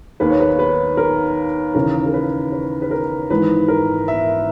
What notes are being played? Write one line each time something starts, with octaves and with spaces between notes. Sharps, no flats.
D#2 D#3 A#3 B4
C#5
B4
B4
A#4
D#2 C#3 E3 A#3 C#4 A#4
A#4
B4
B4
B4
A#4
G#1 G#2 E3 B4
A#4
E5